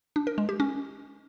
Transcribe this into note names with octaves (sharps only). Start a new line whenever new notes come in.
D4
A#4
G#3
G4
C#4